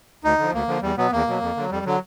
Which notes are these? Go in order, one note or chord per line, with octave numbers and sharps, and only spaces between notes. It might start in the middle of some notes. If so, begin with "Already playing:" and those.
D2 D#4
D3 F3
D2 A#3
D3 F3
E2 G3
B2 F#3 B3
E2 A#3
B2 F#3
F2
D3 F#3
F2 G3
D3 F#3